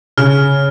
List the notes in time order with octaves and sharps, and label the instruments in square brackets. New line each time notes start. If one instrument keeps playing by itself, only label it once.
[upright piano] C#3 [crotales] F6